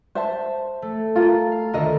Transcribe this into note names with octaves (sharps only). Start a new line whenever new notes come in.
C5 E5 A5
A3
F4 A#4
F5
D2 D3 D#3 A#4 D#5 E5